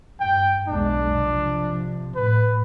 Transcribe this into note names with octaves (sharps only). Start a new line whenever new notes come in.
G2 G5
B1 E2 G#3 D4
C3 F3
A2 B4